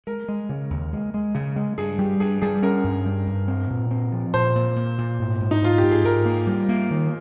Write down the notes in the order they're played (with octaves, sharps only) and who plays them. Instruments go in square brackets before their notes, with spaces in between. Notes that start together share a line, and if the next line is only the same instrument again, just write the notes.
[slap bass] G#3 [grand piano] A#4
[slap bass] G#3
C#3
D#2
G#3
G#3
C#3
G#3
[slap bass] G2 [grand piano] G#4
[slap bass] G3 [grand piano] G4
[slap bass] G2 [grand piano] G#4
[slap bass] G3 [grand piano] G#4
[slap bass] C#4 [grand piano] A#4
[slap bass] G2
G3
G2
C4
A#2
C4
F3
[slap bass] A#2 [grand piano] C5
[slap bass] A#2
A#2
A#2
G#2
G#2
[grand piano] D#4
[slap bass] G#2 [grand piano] F4
[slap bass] G#2 [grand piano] G4
[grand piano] G#4
[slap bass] G#2 [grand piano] A#4
[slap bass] A#3
G3
A#3
D#3